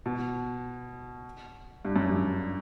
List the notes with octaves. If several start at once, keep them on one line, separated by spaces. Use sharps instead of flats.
B2
G2
F#2
G2